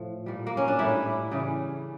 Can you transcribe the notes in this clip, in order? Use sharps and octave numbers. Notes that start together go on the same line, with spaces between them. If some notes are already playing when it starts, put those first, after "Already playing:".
Already playing: A2 F3
A#2 G3
A#3
C#4
D4
A2 G3 E4
C#3 E3 G3